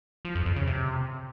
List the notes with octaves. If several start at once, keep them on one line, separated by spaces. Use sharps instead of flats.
F3
F2
F2
C#3
C3